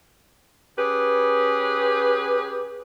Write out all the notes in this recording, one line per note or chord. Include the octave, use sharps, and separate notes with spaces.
C#4 G4 G#4 B4